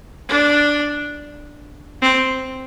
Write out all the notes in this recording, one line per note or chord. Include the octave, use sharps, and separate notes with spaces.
D4
C4